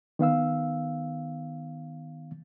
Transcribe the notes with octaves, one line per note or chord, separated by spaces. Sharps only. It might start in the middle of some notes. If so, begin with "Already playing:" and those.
D#3 B3 F5 E6